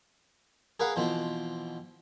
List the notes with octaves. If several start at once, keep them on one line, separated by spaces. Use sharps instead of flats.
G#4 A#4 B4 F5 F#5
B2 E3 F3 C4